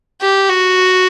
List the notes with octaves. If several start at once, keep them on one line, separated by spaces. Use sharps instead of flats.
G4
F#4